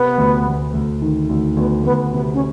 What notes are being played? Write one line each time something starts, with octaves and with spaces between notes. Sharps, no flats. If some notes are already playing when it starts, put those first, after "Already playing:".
Already playing: C3 B3
D2
D2
D2
D#3
D2
D2 B3
D2 B3
C3 B3
C#4